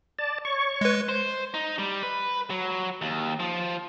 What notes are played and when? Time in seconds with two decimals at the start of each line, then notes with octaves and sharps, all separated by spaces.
0.19 D5 A5
0.45 C#5 C#6
0.81 G#3 B4
1.09 C5
1.54 D#4
1.78 G3
2.03 B4
2.50 F#3
3.01 D#2
3.40 F3